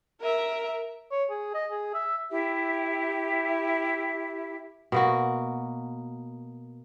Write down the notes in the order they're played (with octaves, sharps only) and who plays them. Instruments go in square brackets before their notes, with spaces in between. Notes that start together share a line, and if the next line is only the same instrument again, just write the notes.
[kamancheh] A#4 E5
[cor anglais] C#5
G#4
D#5
G#4
E5
[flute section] E4 G4 E5
[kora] B2 A#3 F#4